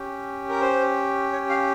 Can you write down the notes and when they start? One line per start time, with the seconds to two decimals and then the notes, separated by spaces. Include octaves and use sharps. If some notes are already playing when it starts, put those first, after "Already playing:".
Already playing: C#4 G4
0.49 A#4
0.61 C5
1.33 C#5
1.50 F5